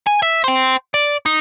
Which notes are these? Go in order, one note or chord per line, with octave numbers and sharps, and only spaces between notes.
G#5
E5
C5 G5
D5
D#4